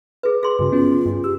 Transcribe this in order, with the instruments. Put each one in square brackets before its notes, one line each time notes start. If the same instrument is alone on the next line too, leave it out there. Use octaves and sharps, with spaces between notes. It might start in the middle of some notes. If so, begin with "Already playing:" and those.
[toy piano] G#4 B4
G#4 C6
[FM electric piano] G2 C#3 [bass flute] F#4
[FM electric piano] B3 C#4 [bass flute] F4
[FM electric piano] G2
[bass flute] G4 [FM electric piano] E6